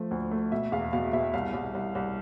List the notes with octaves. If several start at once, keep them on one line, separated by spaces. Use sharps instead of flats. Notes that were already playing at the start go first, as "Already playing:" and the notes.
Already playing: F3 A3
D2
A3
B2 E5
E2 F5
B2 F5
B2 E5
C2 F5
C2
C2
C2